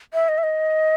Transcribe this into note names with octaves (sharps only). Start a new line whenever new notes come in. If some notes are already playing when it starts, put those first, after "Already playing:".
E5
D#5
E5
D#5